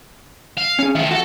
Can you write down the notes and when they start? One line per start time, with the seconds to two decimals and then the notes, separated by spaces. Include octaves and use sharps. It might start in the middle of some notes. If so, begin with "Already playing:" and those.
0.57 F5
0.79 C#4 G#4
0.95 D#3 F3 E5
1.11 F#4 A4